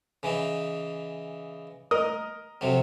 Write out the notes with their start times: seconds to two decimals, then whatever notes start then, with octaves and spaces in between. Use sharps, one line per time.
0.23 C#3 E3 D#4
1.91 A#4 D#5 D#6
2.61 F2 C3 F#3